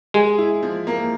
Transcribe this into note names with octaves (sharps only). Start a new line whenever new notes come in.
G#3 G#4
E4
F3
A#3